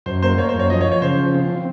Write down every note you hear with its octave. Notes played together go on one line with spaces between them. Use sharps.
F#2 C5
A#3 C5
A#3 C#5
C5
F#2 C#5
F3 D#5
C#5
F3
C#5
C#3 C5
F3
C4
C4